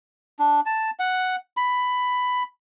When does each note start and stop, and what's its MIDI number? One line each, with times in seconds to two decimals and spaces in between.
0.39 0.60 62
0.66 0.91 81
0.99 1.36 78
1.57 2.43 83